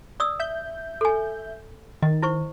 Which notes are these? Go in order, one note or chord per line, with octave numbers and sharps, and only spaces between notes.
D5 D#6 E6
E5 G6
A4 G#5
D#3 D#5
E4 C5 C#6